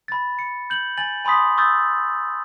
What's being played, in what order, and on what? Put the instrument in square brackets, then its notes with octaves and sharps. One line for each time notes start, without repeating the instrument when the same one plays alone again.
[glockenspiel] B5 A6
C#7
G6 F#7
G#5 A6 F#7
G#5 B5 C6 D#6 B6
C#6 D#6 E6 G6 A6